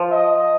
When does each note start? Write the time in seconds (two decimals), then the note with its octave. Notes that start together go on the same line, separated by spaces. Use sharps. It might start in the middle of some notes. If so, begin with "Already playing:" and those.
Already playing: F3
0.12 D#5